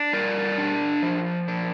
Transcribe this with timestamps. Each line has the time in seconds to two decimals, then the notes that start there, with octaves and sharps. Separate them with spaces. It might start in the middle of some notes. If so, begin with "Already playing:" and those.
Already playing: D4
0.13 G3 A#4 D5
0.58 D4
1.02 F3
1.48 D4